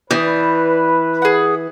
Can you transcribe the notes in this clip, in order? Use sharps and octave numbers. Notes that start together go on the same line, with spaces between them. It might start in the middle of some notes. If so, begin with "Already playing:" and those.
E3 B4 D5 D#6 G6
G#4 F#5